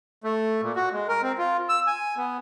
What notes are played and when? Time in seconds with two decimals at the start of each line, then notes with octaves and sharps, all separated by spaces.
0.24 A3
0.62 A#2
0.76 F#4
0.92 G#3
1.08 A#4
1.22 C4
1.38 F4
1.69 E6
1.87 G#5
2.17 B3